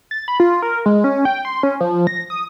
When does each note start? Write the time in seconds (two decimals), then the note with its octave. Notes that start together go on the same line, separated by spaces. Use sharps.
0.11 A6
0.28 B5
0.40 F4
0.62 A#4
0.86 G#3
1.04 C#4
1.25 G5
1.45 C6
1.63 C#4
1.80 F3
2.07 A#6
2.30 D#6